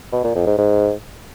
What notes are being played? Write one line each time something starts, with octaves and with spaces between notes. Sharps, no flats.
B2
A#2
F2
G#2
G#2